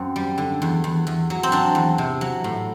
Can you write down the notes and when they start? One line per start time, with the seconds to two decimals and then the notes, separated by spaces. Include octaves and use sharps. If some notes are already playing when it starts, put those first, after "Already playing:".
Already playing: F#2 C4
0.16 G3
0.38 D3
0.62 E2
0.84 E2
1.07 E2
1.30 F#3
1.43 C4
1.52 F#3 D4
1.75 E2
1.98 C3
2.21 F#3
2.44 A2